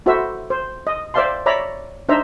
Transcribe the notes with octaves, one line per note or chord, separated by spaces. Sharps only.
E4 F#4 A4 C5 E5
C5
D#5
C5 D5 E5 F5 A5 C6
C#5 D5 E5 A#5 B5
D4 D#4 C5 E5 A#5